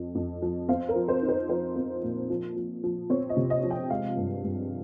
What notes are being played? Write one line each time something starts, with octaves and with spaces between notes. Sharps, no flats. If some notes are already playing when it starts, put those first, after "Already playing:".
Already playing: F2 F3
F2
F3
C4 F5
A#4
F3
C5
D#4
C5
F3 C5
C4
A#2
F3
F3
F3
C4 C#5
D#5
C3
D#5
F3
G5
G#3 F5
G2
G2